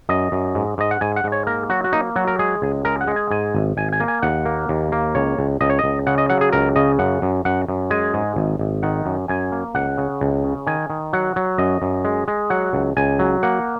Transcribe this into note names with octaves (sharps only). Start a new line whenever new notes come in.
F#2 D#5
F#2
G#2
G#2 D#5
F#5
G#2 G#5
F#5
G#2
C#5
A#3 A#4
F#3 F#4
F#4
A#3 D#4
F#3 F#4
A#4
G#3 G#4
C#2
G#3 A#4
F#5
G#3
G#5
G#2 G#5
G#1
G#1 G#5
G#5
A#3
G#5
D#2 F#5
A#3
D#2
A#3
C#2 C#5
C#2
C#2 D#5
C#5
C#2 D#5
C#3 F#5
D#5
F#3 F#5
G#4
C#2 A#4
C#3 D#5
F#2 F#5
F#2
F#2 F#5
F#2
G#3 G#5
G#2
G#1
G#1
D#3 F#5
F#2
F#2 G#5
A#3
C#2 F#5
C#3
C#2
C#3
D#3 G#5
D#3
F#3 F#5
F#3
F#2 D#5
F#2
G#3
G#3
F#3 F#5
C#2
C#2 G#5
F#3
A#3 F#5